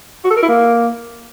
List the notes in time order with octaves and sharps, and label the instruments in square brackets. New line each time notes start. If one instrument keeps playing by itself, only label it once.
[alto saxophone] F#4
A4
A#4
E4
A#3